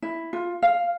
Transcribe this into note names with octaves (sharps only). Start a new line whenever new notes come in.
E4
F4
F5